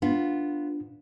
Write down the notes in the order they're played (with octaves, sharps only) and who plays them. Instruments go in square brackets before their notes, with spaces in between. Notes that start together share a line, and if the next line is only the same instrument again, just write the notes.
[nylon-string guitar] B3 F4 [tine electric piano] D4